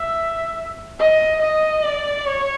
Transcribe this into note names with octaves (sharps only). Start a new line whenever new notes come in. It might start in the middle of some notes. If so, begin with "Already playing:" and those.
Already playing: E5
D#5
D#5
D5
C#5